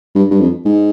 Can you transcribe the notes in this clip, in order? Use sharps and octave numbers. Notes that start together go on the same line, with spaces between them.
G2
G2
F2
G#2